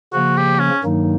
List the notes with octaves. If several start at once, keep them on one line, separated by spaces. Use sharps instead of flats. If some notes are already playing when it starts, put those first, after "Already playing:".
C#3 F3 A#3 F#4
G4
C#4
G2 D#3 F#3 A#3 D#4